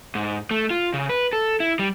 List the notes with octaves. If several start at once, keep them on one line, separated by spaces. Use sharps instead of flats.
G#2
A3
F4
C#3
B4
A4
E4
G3